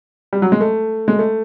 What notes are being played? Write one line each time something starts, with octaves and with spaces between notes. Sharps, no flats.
G3
F#3
G#3
A3
G#3
A3